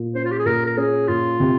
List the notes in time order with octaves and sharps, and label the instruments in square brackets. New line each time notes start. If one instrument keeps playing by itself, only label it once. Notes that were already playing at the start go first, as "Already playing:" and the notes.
Already playing: [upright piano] A#2
[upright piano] C#4 [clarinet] C5
[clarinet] F4
G4
G#4
[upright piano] A#2 [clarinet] A#4
[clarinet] A#4
[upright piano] C#4 [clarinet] G#4
[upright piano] A#2 [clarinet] F4
[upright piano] C3